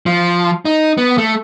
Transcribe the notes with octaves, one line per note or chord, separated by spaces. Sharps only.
F3
D#4
B3
A3